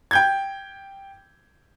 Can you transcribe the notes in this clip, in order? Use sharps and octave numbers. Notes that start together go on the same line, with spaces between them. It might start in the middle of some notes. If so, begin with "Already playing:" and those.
G5 G6 G#6